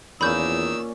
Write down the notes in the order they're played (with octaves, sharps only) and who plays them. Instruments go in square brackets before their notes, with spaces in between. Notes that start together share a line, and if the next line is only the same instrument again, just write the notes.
[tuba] E2 [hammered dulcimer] A#2 C#4 D5 [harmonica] D#3 E6 [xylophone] B5 G6